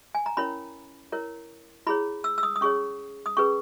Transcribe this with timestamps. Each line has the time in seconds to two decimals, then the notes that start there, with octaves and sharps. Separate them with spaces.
0.15 G#5
0.26 A#5
0.37 C#4 E4 A#4 C#5 B5
1.12 E4 A#4 C#5
1.87 E4 G#4 C#5 B5
2.24 E6
2.38 E6
2.43 D#6
2.56 D#6
2.61 C#4 G#4 C#5 C#6
3.26 D#6
3.37 C#4 G#4 B4 C#6